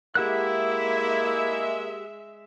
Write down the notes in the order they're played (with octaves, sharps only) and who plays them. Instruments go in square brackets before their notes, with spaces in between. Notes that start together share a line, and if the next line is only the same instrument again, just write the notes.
[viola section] G#3 E5 [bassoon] A#3 [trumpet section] E4 [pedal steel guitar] G4 F#5 F#6